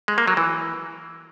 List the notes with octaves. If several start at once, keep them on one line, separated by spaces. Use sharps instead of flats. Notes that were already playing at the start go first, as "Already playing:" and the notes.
G#3
A#3
F#3
E3